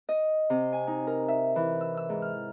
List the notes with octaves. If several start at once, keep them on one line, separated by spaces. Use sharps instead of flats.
D#5
C3
G#5
D#4
A#4
E5
E3
E6
E6
G#2
F6